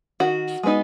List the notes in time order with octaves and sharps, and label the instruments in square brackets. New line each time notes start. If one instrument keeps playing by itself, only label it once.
[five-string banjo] D#3 F#4
G#3 B3 D#4